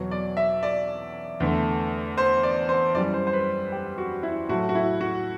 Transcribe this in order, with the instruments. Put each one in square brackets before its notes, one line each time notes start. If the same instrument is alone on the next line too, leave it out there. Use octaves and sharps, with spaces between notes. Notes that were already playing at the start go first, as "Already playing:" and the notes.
Already playing: [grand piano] E2 B2 F#3
D5
E5
D5
E2 D3 A3
C5
D5
C5
F#2 E3 G3 D5
C5
C5
B4
G4
F#4
E4
A2 F#3 A3 F#4
F#4
E4
F#4